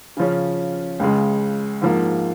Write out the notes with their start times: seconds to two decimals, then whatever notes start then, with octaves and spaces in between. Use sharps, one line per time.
0.17 C#3 F3 C#4
1.00 C#2 C#3 G#3
1.82 G#2 F3 A#3